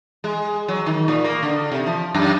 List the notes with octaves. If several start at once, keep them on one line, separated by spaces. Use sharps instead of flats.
G#3
F#3
D#3
A#2
A#3
D3
C3
F3
F#2